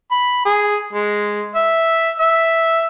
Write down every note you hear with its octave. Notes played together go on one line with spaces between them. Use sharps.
B5
G#4
G#3
E5
E5